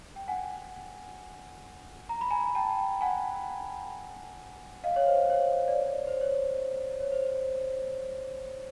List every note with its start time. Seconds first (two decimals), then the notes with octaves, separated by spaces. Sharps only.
0.16 G5
0.28 F#5 G#5
2.09 A#5
2.21 B5
2.31 G#5 A#5
2.55 G5 A5
3.01 F#5 G#5
4.84 D#5 F5
4.96 C#5
5.06 C5
5.30 C#5
5.68 D5
5.75 C#5
6.07 C5
6.21 C#5
7.00 C#5
7.12 C5